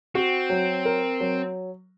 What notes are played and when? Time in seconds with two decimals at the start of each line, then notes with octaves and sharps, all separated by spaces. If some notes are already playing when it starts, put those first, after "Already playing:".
0.15 C4 F#4
0.50 F#3
0.85 A#4
1.20 F#3